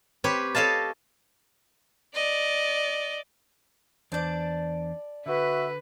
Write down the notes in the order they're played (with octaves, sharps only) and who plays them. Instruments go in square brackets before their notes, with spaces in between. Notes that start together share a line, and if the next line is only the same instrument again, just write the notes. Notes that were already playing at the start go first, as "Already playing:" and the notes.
[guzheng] C4 G4 B4 C#5
A4 C#5 D#5 F5 A5
[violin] D5 [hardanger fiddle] D#5
[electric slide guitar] E2 D4 C5 [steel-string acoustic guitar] D5 A5
[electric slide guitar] D3 [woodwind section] F#4 E5 [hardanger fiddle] B4